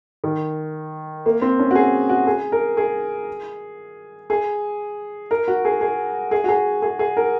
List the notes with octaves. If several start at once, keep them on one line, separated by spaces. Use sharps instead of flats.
D#3
A#3
C4
C#4
F#4
G#4
F#4
G#4
A#4
G#4
G#4
A#4
F#4
G#4
G#4
G#4
F#4
G#4
G#4
G#4
A#4